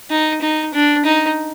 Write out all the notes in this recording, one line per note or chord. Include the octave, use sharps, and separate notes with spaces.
D#4
D#4
D4
D#4